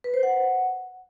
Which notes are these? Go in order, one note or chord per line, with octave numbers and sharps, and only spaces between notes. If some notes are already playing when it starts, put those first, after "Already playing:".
B4
C5
F#5